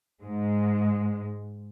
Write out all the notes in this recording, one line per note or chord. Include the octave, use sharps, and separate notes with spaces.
G#2 G#3